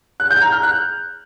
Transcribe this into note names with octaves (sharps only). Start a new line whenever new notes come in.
F#6
G6
A#5
F6
F#6